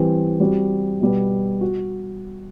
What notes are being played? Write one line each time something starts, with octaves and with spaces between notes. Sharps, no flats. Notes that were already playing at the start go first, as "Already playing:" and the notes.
Already playing: E3 G3 C4 G4
G3 C4 F#4
B2 G3 B3
F#4